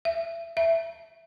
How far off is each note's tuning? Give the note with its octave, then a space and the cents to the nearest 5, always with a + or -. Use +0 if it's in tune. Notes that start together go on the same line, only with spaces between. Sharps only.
E5 +25
E5 +10